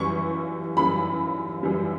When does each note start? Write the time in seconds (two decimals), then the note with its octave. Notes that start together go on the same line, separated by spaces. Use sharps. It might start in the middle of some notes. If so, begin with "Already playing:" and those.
Already playing: F#2 E3 G3 C#6
0.77 F#2 E3 G3 B5
1.63 F#2 E3 G3